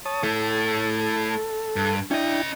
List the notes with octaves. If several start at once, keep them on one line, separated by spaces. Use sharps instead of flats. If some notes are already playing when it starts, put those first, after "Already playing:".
C#5 A5 D#6
A3 E4 A4
G2
C#4 D4 E4 D#5 G5